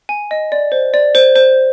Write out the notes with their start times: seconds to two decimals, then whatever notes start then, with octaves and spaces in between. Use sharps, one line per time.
0.09 G#5
0.31 D#5
0.52 D5
0.72 C5
0.94 D5
1.15 C5
1.35 C5